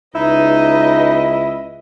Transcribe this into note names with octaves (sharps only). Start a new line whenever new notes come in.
C#2 D#4 E4 B4 D#5